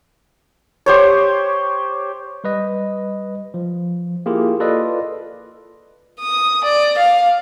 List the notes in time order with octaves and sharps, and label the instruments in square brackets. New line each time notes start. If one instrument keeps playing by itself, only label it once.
[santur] G4 C5 C#5
[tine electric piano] G3 B4 D#5
F3
A#3 E4 F4 G4 G#4
F4 A4 B4 D5 D#5
[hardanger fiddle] D#6
D5
F5